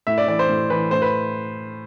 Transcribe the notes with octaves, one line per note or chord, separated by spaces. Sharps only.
A2 E5
D5
E3 D5
C5
A2
E3 B4
A2 C5
B4